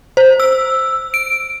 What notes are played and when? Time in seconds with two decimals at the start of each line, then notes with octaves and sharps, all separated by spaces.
0.17 C5
0.40 E6
1.14 D7